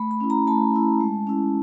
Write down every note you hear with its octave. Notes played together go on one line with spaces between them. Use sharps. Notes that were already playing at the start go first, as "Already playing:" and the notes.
Already playing: A3 B5
B5
C#4 E4
A#5
A3 A5
C#4 E4
G#3
C#4 E4